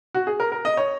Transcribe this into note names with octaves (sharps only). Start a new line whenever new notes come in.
F#4
G#4
A#4
A#4
D#5
C#5